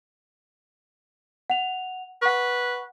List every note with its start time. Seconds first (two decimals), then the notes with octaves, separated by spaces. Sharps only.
1.50 F#5 F7
2.22 B4 F#5 C#6